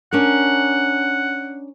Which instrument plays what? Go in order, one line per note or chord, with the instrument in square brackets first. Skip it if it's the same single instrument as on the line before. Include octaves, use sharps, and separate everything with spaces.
[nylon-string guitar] C#4 D4 A#4 [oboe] F#5